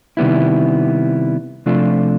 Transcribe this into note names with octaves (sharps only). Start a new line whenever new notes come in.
C3 D#3 G3 B3 E4
C3 F3 A3 D4 F4